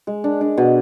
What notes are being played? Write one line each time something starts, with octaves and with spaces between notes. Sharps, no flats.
G#3
D4
D4
B2